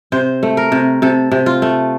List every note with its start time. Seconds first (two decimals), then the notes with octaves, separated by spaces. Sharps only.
0.12 C3 C5
0.43 A3
0.57 A#4
0.72 C3
1.02 C3 A4
1.31 C3
1.46 F4
1.62 A3